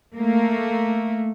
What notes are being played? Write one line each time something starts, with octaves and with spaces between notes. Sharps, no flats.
A3 A#3